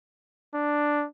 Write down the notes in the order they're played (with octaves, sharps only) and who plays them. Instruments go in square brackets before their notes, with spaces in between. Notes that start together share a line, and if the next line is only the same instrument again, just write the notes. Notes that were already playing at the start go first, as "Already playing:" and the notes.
[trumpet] D4